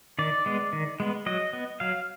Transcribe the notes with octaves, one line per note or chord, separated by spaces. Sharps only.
D#3 D5
G#3 B3
D#3
G#3 B3
F#3 D#5
B3
F#3 F5